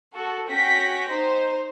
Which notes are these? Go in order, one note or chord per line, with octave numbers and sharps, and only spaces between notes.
F#4 A4
C#4 F#4 G5 A#6 B6
D#4 C5